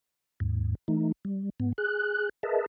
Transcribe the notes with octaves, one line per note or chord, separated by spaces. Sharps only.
D#2 G#2
E3 A3 D#4
G3
G#2 B3
G#4 F#6
G#4 A#4 B4 D#5 E5 A5